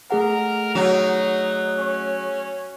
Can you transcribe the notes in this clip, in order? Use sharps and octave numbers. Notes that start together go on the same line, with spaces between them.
A3 G#4 A#4 F#5
F#3 D#4
C#4